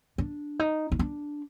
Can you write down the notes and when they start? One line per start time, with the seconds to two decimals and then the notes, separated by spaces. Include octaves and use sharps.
0.18 D4
0.59 D#4
0.92 D#4
0.99 D4